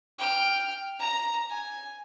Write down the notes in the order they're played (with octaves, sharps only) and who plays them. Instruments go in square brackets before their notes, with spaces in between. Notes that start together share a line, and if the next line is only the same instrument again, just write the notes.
[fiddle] G5 F6
A#5
G#5